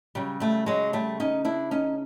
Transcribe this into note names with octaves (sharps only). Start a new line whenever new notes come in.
C#3 F#3 G3
G3 A3
F#3 G#3
G3 A3
C#4 D#4
D4 E4
C#4 D#4